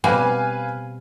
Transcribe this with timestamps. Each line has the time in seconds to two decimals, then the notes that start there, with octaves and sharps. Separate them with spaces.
0.04 B2 G3 C4 B4 F5 G#5